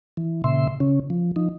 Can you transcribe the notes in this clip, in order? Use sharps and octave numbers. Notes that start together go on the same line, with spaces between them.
E3
A#2 C#3 E5 C6
C#3 C#4
F3
F3 D#4